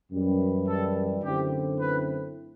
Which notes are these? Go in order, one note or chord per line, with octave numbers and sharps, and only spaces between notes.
F#2 E3 G3
A4
F#2 D3 A3 C4 E4 G4
B4